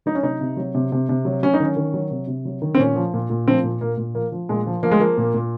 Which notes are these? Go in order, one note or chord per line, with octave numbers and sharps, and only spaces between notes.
F#3 D#4
C#4
C3 D#4
C3
F#3
C3
C3
C3
F#3
F#3 C#4
D#4
D#3 C#4
D#3
F#3
C3
C3
F#3
D#3
C4
A#2 C#4
F3
A#2
A#2
F3 C4
A#2
A#2 A#3
A#2
F3 A#3
F3
A#2 G#3
F3
F3 A#3
G#3
F3 A#3
A#2
A#2